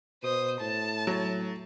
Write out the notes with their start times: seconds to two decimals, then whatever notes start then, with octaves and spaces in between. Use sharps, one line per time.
0.23 B2 C5 D#6
0.60 A2 A5
1.07 F#3